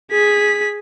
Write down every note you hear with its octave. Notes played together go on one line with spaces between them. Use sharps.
G#4 B6